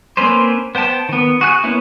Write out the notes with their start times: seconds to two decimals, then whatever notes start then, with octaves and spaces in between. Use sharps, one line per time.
0.17 A#3 C4 C#4 B4 C5
0.75 B3 C5 G5 A5
1.09 D#3 B3
1.41 F#4 G#4 F#6
1.64 A#3 B3 C#4 E4